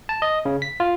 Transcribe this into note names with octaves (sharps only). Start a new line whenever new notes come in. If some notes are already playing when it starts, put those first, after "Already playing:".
A5
D#5
C#3
B6
F4